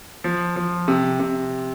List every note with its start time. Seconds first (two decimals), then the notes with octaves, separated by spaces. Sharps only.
0.24 F3
0.56 F3
0.88 C3
1.20 C3